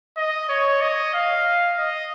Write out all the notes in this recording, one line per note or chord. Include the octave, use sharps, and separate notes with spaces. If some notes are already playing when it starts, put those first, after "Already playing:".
D#5
C#5
D#5
F5
D#5